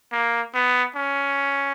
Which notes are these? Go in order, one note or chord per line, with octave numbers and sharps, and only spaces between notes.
A#3
B3
C#4